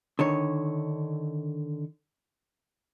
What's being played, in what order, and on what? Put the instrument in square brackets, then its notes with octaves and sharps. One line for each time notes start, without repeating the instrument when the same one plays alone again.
[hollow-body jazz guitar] D3 D#3 C#5